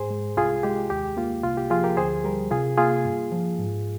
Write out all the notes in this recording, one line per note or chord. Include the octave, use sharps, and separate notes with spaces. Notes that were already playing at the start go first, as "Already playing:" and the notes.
Already playing: G#2 G#4 C5
G#3
C2 F4 G#4
G#3 G4
D#2 G4
A#3 F4
C2 F4
G4
F3 F4 G#4
G4 A#4
D2 G#4 C5
G3 G4 A#4
C3 F4 G#4
A#3 F4 G#4
G2
F3
G#2